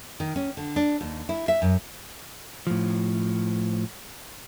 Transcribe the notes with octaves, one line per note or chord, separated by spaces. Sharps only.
D#3
C#4
D3
D4
D#2
E4
E5
F#2
A2 F3